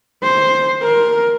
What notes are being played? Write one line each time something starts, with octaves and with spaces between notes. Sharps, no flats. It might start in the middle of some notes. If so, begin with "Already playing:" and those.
C5
A#4